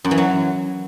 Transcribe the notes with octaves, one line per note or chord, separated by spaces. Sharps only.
F#2
E3
F#3